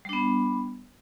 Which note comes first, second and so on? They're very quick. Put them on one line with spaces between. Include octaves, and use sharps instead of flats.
G3 D4 B3